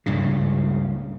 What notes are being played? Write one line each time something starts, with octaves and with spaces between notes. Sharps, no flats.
C#2 G2 A#2 C#3